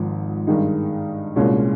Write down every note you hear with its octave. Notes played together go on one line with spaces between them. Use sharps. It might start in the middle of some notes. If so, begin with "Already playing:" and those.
Already playing: G#1 G#2 F3
G2 D#3 G#3 D#4
C2 A#2 G#3 C#4